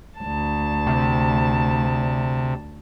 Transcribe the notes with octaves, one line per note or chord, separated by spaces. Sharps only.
D2 A5
C3